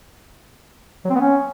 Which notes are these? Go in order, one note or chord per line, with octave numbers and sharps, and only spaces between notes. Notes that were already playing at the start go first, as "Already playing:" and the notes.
F#3
C4
B3
C#4